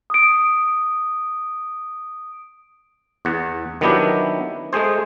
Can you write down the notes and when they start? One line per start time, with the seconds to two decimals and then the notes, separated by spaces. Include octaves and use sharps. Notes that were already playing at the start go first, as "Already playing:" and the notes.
0.10 D#6 D7
3.25 E2 F#5
3.81 D#3 F#3 B3 D4 E4 G4
4.73 G#3 A3 G#4 C5